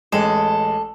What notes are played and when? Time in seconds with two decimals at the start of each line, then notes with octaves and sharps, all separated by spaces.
0.12 A1 G#3 A4